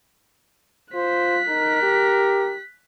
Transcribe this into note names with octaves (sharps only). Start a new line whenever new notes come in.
F4 C5 F#6 B6
D#4 A#4
G4